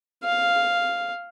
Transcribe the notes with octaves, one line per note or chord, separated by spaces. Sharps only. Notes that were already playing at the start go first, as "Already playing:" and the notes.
F5